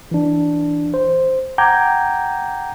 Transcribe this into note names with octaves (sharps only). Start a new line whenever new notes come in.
E3 D4
C5
F#5 G5 A#5 D6 G6 G#6